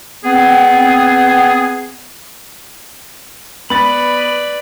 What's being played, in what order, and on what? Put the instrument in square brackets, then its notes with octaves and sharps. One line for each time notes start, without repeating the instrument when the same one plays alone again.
[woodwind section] B3 C4 G#4
[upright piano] B3 A6 [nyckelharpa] B4 D5 [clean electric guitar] B5